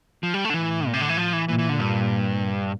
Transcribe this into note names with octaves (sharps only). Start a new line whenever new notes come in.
F3
G3
A3
D3
A2 E3
A#2
C3
D3
E3
F3
E3
A#2 E3
E3
D3
G2